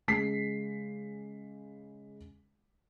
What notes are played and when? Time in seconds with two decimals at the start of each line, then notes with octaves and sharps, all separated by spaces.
0.08 C#3 G#3 B6 C7